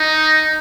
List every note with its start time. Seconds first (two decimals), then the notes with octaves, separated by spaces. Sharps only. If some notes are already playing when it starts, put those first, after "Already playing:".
Already playing: D#4